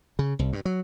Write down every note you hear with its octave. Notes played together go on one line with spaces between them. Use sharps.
C#3
C2
G2
F#3